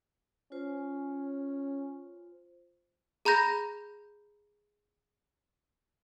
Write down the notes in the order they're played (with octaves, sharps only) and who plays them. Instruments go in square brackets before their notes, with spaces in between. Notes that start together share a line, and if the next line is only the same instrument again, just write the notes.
[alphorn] C#4 [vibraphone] F4 C5
[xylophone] G#4 A#5 B5 G6 A#6